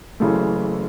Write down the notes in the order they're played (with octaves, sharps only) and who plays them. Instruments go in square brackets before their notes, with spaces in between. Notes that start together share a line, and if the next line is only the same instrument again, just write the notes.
[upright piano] F#1 F#2 C#3 E3 A3